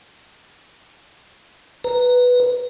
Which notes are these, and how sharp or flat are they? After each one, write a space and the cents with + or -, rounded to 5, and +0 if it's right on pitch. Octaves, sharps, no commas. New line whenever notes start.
B4 +0 A#5 +0